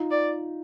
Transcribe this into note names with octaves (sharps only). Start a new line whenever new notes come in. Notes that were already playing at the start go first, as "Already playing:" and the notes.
Already playing: D#4 F4
D5